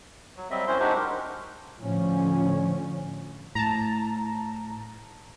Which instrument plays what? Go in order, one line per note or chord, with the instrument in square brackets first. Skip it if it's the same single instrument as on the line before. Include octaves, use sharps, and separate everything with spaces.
[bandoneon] F#3
F#3 G3 C4 D#5 E5
F#2 C4 C#4 E4 C5 C6
G#3 D4 D#4 F#4 G4 C5
A#4
[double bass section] A2 D3 F3 C#4
[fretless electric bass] A2 [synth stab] A5 A#5